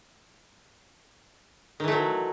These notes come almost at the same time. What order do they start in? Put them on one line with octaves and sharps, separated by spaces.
D#3 E3 A3 F#3